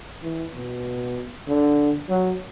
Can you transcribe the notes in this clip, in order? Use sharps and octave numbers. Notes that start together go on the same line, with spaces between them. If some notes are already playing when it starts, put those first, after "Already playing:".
E3
B2
D3
F#3